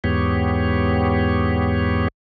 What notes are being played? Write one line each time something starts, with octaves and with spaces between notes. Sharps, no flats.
E2 G#2 B3 G4 C#5